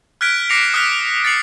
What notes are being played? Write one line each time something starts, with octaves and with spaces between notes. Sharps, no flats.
F6 F#6 G#6 B6 D7
D6 A#6 C7 C#7 F7
D#6 F6 F#6 A#6 B6
A6 C7 C#7 F#7